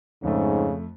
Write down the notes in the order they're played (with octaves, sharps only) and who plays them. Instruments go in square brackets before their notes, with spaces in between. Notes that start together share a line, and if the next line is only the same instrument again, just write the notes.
[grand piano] F2 A3 [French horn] G#2 [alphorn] C#3